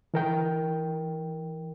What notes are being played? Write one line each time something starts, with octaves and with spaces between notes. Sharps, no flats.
E3 A#4 G5